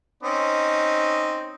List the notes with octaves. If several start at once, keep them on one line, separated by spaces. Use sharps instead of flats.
C4 C#4 D#4